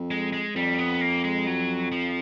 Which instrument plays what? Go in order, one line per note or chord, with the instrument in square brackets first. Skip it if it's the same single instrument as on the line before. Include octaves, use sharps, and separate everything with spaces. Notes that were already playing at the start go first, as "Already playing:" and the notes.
Already playing: [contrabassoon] F2
[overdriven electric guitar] G#3
G#3
[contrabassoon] F2 [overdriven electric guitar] G3
[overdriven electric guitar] B3
A#3
G#3
F#3
F3